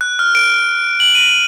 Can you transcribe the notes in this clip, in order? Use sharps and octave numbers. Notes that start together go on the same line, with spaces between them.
F#6
F6
D7
F#7
D#7